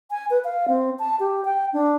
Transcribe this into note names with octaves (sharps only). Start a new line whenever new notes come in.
G#5
B4
F5
C4
A5
G4
G5
D4